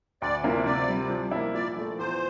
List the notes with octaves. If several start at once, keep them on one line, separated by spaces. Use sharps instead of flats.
D2 D5
C3 F3 A#3 E4
C3 D5
G3 C4
F3
A#3 E4
A#2 D5
F3 A3
E2 C5